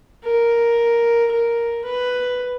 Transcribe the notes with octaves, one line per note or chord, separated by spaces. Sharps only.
A#4
A#4
B4